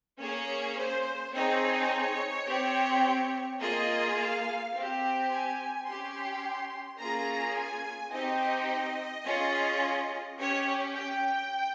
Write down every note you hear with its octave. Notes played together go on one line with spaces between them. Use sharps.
A#3 C#4 G#4 C#5
C5
C4 D#4 G#4 C#5
C4 G4
A#3 F4 G#4 D#5
F5
C4 G4
G#5
C#4 G4 C6
A#3 C#4 F4 G#4 A#5
G#5
C4 D#4 G4 D#5
C#4 F4 G#4
C#4 G4 C#5
G5